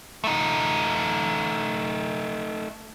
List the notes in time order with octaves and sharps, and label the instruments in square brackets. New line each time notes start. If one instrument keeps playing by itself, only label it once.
[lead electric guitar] A3 D#4